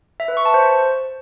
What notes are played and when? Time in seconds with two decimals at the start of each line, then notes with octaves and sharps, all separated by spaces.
0.20 E5
0.28 B4
0.37 C#6
0.45 A5
0.54 C5